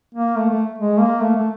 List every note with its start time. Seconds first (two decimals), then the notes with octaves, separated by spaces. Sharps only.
0.15 A#3
0.36 A3
0.50 A3
0.78 G#3
0.99 A#3
1.20 A3
1.35 A3